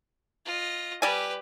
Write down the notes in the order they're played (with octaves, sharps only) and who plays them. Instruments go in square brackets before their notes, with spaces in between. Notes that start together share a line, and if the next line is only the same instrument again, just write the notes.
[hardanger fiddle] F4 D#5
[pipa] G3 D5 G#5 [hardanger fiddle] G4 B4